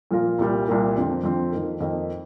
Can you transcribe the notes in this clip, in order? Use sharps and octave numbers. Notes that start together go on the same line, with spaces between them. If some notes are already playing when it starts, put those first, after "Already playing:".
A#2 F3 A#3 F4 A#4
C2 A#2 G3 A#3
C2 A#2 G3 A#3
F2 D3 F3 C4
F2 D3 F3 C4
F2 D#3 A#3 D#4 A#4
F2 D#3 A#3 D#4 A#4